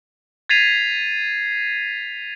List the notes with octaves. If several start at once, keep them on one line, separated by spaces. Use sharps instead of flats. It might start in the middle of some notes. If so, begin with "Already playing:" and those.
G#6 A6 B6 C7 D#7 F7